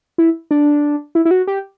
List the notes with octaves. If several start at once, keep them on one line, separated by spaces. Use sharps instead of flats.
E4
D4
E4
E4
F#4
G4